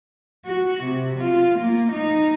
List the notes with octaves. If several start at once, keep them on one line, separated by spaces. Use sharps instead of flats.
F#4
C3
F4
A#3
D#4